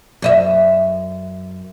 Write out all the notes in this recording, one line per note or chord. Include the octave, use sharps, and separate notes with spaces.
F#2 D#5 E5